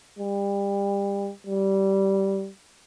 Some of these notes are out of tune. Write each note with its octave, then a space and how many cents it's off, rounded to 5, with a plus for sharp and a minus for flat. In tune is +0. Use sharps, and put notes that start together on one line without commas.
G3 +30
G3 -15